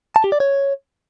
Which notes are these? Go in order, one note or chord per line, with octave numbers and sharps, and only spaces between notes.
A5
G4
D5
C#5